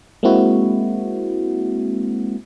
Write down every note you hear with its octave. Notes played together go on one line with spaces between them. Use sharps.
G#3 A#3 C4 E4 F#4